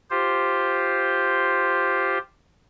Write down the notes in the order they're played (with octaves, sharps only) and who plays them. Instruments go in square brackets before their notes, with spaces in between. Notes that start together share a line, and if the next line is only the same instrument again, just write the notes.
[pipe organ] F4 G4 C5